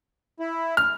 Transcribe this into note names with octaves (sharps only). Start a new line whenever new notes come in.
E4
F6